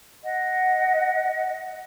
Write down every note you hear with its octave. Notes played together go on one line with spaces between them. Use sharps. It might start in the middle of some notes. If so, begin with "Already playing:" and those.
D#5 F#5